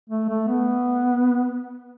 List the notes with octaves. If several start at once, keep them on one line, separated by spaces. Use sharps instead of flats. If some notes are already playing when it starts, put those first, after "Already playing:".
A3
A3
B3